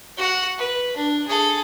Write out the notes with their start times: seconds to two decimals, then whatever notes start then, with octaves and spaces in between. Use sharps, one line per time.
0.18 F#4 F#5
0.58 B4
0.96 D4
1.27 G#4 A4